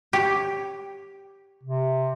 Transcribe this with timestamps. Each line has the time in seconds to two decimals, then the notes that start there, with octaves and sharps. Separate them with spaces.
0.13 G4 C#5
1.63 C3